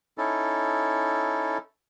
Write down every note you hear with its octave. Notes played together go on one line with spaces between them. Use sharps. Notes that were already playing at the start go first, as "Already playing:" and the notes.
C#4 D#4 E4 A4